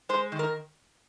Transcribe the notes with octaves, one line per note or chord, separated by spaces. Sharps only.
G#3 C5
D#3
A#4